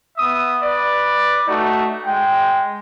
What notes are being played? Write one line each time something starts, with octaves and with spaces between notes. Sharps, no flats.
B3 E5 D#6
B4 D5
A3 D#4 F#4
G#3 G5